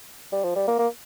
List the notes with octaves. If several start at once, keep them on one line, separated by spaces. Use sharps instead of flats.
G3
F3
G3
A#3
A#3